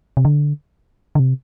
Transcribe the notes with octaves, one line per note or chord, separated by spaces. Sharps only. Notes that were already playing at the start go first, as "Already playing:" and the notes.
C3
D3
D3
C3